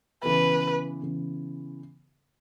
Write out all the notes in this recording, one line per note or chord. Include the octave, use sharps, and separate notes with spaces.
C#3 E3 B3 B4
C#3 E3 B3